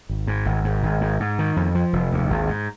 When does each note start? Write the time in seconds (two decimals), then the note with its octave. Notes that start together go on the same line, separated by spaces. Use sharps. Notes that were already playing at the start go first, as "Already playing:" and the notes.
0.09 G#1
0.28 G#2
0.46 G#1
0.64 G#2
0.83 G#1
1.01 G#2
1.20 G#2
1.39 D#3
1.56 F2
1.75 F3
1.93 F1
2.12 D#2
2.30 G#1
2.48 G#2